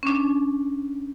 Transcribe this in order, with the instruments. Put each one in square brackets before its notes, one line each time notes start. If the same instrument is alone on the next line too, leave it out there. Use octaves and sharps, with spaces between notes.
[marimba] C#4 D4